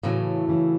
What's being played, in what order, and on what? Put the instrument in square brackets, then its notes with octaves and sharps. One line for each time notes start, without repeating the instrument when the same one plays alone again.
[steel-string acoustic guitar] A2 F#3 A3 [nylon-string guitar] C#3 E3
[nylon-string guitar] C#3 E3